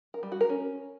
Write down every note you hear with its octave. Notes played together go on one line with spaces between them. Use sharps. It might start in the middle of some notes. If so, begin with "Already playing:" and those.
A#4
G3
F#4
A#4
C#4